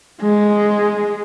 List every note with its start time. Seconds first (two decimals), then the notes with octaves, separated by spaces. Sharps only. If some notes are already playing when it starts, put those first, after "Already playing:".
0.22 G#3